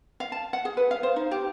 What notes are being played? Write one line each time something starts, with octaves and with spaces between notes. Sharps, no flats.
F5
A5
F#5
G#4
B4
F5
C5
D#4
G4